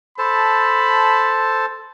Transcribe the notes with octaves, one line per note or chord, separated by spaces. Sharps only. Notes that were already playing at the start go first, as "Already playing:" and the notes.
A4 C5 A5 B5